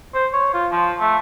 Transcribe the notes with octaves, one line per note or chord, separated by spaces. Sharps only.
C5
C#5
F4
F3
A3